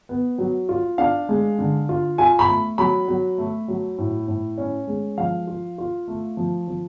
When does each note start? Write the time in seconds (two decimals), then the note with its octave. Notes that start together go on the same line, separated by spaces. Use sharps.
0.09 B3
0.38 F#3
0.69 F4
0.98 D4 F5
1.29 G#3
1.58 D3
1.89 F4
2.18 F4 G#5
2.39 B5
2.48 A3
2.78 F#3 B5
3.08 F#3
3.38 A3
3.68 F#3
3.98 A2
4.28 A2
4.58 C#4
4.87 G#3
5.18 F3 F5
5.47 F4
5.78 F4
6.08 A3
6.37 F3
6.68 F3